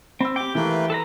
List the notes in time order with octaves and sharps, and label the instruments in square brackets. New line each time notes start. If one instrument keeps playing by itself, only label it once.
[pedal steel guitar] C4 [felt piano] B5 E6
[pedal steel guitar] G4 G5 [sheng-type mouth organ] D6
[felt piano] E3 [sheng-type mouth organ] A3 A#3 B4
[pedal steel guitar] A4 B4 A#5